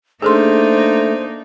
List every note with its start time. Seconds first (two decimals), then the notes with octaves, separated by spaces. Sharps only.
0.22 A3 A#3 D4 D#4 G#4 A4 C5 C6